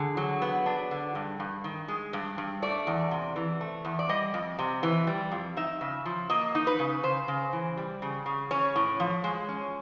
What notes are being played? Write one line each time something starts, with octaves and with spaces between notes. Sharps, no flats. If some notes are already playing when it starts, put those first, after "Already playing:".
Already playing: D3 G#4
F#3
B3
D4
D3
G2
G2
D#3
G#3
G2
G2
A3 D5
E2
C3
E3
A3
E2
D5
G3 D#5
F2
C3
E3
G3
F2
D#4 E5
C#3
F3
A#3 D#5
D#4
B4
C#3
C#3 C5
C#3
E3
G3
C#3
C#3
C#4 C#5
A2
F3
G#3
C#4